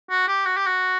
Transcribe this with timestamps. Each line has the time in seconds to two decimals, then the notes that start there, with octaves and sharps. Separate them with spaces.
0.10 F#4
0.28 G4
0.47 F#4
0.57 G4
0.67 F#4